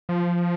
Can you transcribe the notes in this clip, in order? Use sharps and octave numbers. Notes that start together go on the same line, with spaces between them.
F3